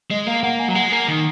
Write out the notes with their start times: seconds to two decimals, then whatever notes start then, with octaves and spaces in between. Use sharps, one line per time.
0.11 G#3 D#5
0.27 A#3 F5
0.43 A#3 F#5
0.60 G#5
0.68 F#3
0.75 G#3 F#5
0.92 A#3
1.08 D#3